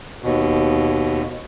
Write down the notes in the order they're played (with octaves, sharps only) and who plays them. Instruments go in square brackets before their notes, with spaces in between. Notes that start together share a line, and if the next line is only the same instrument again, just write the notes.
[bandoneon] D#2 B2